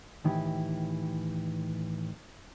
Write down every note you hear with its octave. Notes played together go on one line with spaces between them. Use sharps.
A2 D#3 E3 E4 G4